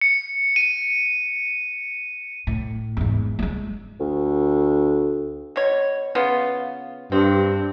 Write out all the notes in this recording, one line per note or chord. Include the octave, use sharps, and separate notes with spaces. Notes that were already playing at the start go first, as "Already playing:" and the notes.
C#7
D#7
A2
E2 G#2
G#3 A3
D2
B2 C#5
C#3 B3 F4
G2 C4